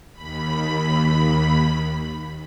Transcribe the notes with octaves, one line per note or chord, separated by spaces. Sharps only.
D#2 B5